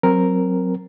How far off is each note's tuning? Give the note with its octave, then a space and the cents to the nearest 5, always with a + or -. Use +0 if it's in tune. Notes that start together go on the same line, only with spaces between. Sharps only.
F#3 +0 C4 +15 A#4 +0